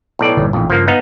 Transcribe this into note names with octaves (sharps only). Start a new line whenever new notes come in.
B1 A2 D5
G1 A#2 D#3
A1 F2 A#2 D#3
G2 C#3 F3 A#3
B3 D#4 F5